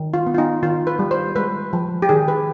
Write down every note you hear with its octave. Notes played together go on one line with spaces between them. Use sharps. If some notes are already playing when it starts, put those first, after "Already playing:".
Already playing: D#3
F4
B3
F4
D#4
D#3 F4
B4
G3
C5
G#3 B4
F3
G4
D#3 G#4
B4